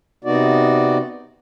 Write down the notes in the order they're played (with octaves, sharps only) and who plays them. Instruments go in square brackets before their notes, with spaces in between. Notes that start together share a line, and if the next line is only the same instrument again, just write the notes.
[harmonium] C3 B3 D#4 F#4 D5